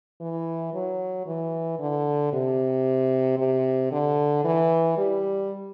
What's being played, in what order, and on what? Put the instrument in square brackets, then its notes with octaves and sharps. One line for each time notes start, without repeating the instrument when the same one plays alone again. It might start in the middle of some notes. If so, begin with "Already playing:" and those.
[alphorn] E3
F#3
E3
D3
C3
C3
D3
E3
G3